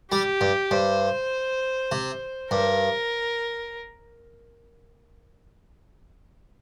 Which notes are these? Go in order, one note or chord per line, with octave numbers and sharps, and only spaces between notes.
G3 G4
G2
G2 C5
C3
G2 A#4